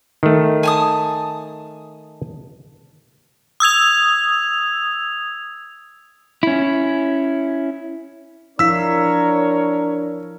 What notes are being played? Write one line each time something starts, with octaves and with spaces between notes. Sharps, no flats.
D#3 A3
G#5 A5 D#6
D#6 E6 G#6 F7
C#4 E4
F3 D4 E4 A#4 C#5 F5 E6 B6